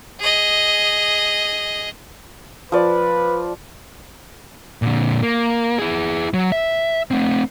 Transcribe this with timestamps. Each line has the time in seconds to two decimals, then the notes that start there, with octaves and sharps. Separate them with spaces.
0.19 G#4 D#5
2.72 F3 B4 D5
4.82 A#2 D3
5.23 A#3
5.78 E4 G#4
6.34 F#3
6.52 E5
7.11 A3 C4